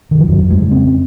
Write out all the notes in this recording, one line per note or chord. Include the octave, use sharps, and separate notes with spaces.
D#3
F3
F2 F#3
G#3
C#3
C4